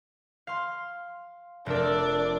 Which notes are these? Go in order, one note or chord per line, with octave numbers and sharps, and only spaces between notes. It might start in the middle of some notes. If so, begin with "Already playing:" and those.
F5 C6
F1 D4 A#4 D5 E6